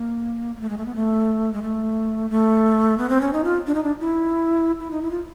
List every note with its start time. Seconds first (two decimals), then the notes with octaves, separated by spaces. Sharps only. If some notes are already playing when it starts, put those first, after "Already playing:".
Already playing: A#3
0.56 A#3
0.61 A3
0.69 G#3
0.78 A3
0.86 B3
0.95 A3
1.53 G#3
1.62 A3
2.30 A3
2.98 B3
3.09 C4
3.21 C#4
3.33 D#4
3.44 F4
3.67 D4
3.75 D#4
3.83 D4
4.01 E4
4.80 E4
4.91 D#4
5.02 E4
5.11 F4